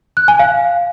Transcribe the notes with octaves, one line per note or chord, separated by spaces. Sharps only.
F#6
G#5
F5